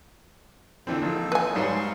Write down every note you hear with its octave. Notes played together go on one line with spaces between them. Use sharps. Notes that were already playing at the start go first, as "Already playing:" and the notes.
F2 A#2 D3 E3 C4 A4
A#1 A#2 D#4 A4
B4 G#5
G#2 F#3 G3 F5 C6 C#6